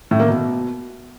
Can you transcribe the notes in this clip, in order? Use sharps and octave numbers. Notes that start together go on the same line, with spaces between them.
A2
A#3
B2